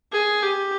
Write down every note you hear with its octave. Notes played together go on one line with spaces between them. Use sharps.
G#4
G4